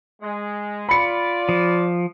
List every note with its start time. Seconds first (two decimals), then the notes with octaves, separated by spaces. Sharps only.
0.21 G#3
0.89 F4 D5 B5 C#7
1.49 F3